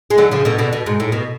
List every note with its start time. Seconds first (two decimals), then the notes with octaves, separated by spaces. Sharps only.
0.10 G#3
0.18 D3 F#3
0.31 C#3 F3
0.45 B2 D3
0.59 B2 D3
0.73 B2
0.86 G#2
1.00 A2
1.12 B2